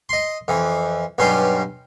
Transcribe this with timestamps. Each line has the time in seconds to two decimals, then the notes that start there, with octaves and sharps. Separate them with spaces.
0.09 D#5 C6
0.48 F2 E3
1.18 B1 G2 G3 C#4 C6